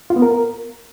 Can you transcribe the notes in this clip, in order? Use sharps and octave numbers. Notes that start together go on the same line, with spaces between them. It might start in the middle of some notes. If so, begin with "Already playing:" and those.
F4
B3
A#4